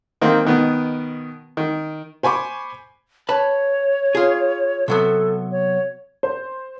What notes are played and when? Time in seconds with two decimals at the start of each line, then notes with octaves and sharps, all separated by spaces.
0.21 D#3 A#3 C4
0.45 B2 D#3 B3
1.57 D#3
2.23 C5 G#5 B5 C#6 D6
3.29 B4 C#5 A5
4.15 F4 G#4
4.88 C3 F#3 B3 A4
5.51 C#5
6.23 C5